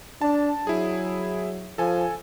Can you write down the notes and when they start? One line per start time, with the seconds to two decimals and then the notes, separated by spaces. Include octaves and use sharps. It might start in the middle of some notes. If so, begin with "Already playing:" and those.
0.21 D4 A5
0.67 F#3 E4 G#4
1.78 F3 A4 G#5